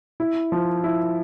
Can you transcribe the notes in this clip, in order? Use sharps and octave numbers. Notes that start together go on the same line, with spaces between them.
E4
F3
E4